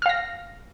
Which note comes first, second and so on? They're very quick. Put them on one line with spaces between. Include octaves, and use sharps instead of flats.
F6 F5 A#6